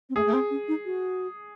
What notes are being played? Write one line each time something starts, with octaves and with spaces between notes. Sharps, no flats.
C4
A3 G#4
A3
C4
C#4
D#4
F#4